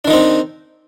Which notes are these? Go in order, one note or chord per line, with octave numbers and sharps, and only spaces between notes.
D#3 C4 D4 D#4